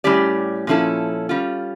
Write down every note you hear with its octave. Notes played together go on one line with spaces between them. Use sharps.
A2 G3 C#4 G4 D5
A#2 F3 C#4 E4 A4
G3 C#4 F4